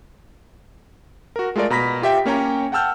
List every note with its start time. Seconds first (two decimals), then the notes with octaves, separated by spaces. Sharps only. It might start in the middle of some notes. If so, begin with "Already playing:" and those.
1.36 F#4 A#4
1.56 G#3 A3 F4 A#4 D5
1.70 B2 A#5 B5 A#6 B6
2.02 F4 G4 E5 G5
2.25 A#3 C#4 C#5 G5 A#5
2.72 F#5 G5 A5 E6 F6 G6